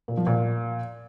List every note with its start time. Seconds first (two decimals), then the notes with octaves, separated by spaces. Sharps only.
0.08 A#2
0.17 F3
0.27 A#2